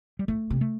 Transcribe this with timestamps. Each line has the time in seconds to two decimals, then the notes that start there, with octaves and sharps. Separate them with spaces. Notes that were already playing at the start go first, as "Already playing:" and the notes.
0.19 G3
0.28 A2 A3
0.50 C3
0.61 A3